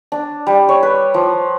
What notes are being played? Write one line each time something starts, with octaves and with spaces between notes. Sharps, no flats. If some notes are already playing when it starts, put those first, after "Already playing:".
D4
G3
C#5
B4
F3